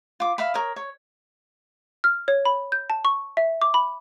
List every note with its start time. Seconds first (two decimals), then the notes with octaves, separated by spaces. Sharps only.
0.20 F4 D6
0.38 E5 F5 B5
0.54 A#4 C#5 D#6
0.76 C#5
2.04 F6
2.28 C#5
2.45 B5
2.72 G6
2.90 A5
3.05 C#6
3.37 E5
3.62 D6
3.74 B5